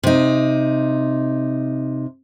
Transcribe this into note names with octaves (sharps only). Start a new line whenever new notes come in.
C3 D#4